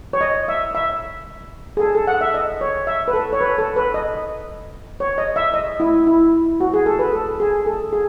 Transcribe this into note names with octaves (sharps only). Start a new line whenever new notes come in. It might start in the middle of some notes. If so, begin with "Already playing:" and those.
C#5
D#5
E5
E5
G#4
A4
A4
F#5
E5
D#5
C#5
E5
B4
A4
C#5
B4
A4
B4
D#5
C#5
D#5
E5
D#5
E4
E4
F#4
G#4
A4
B4
A4
G#4
A4
G#4